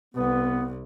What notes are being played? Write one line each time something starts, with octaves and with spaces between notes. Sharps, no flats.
C2 B3